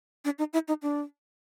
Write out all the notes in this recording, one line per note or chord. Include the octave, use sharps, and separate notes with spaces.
D4
D#4
E4
D#4
D4